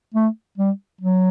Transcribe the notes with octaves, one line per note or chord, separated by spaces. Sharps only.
A3
G3
F#3